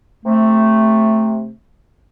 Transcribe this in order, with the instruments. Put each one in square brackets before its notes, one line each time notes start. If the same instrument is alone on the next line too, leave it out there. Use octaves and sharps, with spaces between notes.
[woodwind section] C3 A3